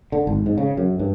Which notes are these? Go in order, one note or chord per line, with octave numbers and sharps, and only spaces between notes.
D3
G#1
G#2
C#3
F#2
G2